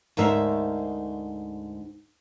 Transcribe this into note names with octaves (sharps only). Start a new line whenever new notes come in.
D2 G#2 A#4 E5